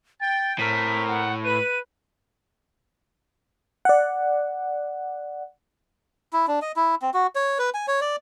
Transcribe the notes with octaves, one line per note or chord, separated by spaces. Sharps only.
G5 A6
A2 C4 A#4 B6
F#5
B4 D#7
D5 F#5
E4
D4
D#5
E4
C4
F#4
C#5
B4
G#5
C#5
D5